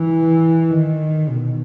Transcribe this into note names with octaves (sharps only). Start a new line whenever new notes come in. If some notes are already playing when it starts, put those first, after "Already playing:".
Already playing: E3
D#3
B2